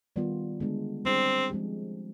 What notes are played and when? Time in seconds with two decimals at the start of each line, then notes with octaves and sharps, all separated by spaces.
0.16 D#3 G3 B3 F4
0.60 D3 G#3 B3 D4
1.05 G3 C4 D4 G#4
1.50 F3 G#3 C4 G4